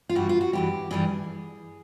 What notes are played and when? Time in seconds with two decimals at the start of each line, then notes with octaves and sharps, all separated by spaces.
0.09 F4
0.15 G2 E3 G3 F#4
0.29 F4
0.41 F#4
0.53 G2 E3 G3 G4
0.91 G2 E3 G3 G#4